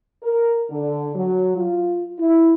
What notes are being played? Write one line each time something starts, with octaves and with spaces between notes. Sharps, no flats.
A#4
D3
F#3
F4
E4